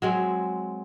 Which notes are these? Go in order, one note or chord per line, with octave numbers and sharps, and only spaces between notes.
F#3 G#3 C4